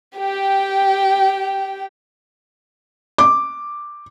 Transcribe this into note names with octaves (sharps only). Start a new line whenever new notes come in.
G4 G5
D6